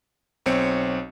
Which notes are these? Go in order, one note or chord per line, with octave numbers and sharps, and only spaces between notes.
B1 C4 C#5 C#7